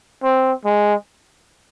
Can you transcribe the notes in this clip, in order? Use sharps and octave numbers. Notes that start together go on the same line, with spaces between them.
C4
G#3